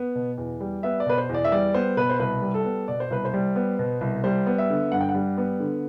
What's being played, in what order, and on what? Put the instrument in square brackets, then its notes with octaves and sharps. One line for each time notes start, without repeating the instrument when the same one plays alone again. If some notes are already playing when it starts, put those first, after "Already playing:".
Already playing: [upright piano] B3
B2
E2
G3
B3 E5
D5
B2 B4
C5
E2
D5
E5
G3 D5
B3 C5
B2 B4
C5
C2 B4
G3
A4
B3
B2 D5
C5
C2 B4
C5
G3
B3
B2
C2
G3 C5
B3
E5
D3
G2 F#5
G5
F#5
G3
B3
D3